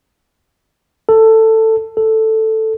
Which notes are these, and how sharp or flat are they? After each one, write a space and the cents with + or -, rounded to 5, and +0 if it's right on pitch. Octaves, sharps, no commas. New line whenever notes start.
A4 +15
A4 +5